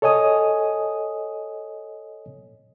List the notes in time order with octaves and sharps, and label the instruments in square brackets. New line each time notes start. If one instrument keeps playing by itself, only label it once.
[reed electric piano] A4 C#5 D#5 G#5 D#6